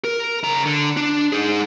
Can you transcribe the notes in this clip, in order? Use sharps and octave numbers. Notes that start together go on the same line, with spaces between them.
A#4
C#3 A#5
D3
D4
D#4 G#4